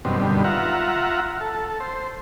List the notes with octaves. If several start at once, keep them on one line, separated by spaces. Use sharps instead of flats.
F#2 B2 D#3 G3 C4
G2 B2 D3 D#3 G3
F4 E5 F#5 A#5
A4
C5